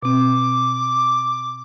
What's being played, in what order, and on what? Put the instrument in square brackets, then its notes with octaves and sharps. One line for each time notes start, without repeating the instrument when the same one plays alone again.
[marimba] B2 C4 [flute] D6